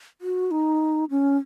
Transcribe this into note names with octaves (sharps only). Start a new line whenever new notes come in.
F#4
D#4
C#4